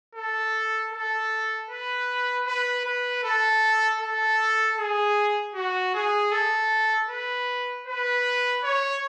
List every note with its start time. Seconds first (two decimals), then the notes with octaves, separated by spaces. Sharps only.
0.15 A4
0.92 A4
1.70 B4
2.46 B4
2.85 B4
3.24 A4
4.01 A4
4.77 G#4
5.55 F#4
5.94 G#4
6.32 A4
7.09 B4
7.87 B4
8.64 C#5